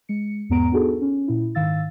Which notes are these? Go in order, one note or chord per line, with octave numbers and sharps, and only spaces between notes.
G#3 C#7
E2 G#2 B3 A#5 D7
B3 D4 D#4 F#4 G#4 A4
C#4
A#2 E4
G#2 D#3 F5 E6 A6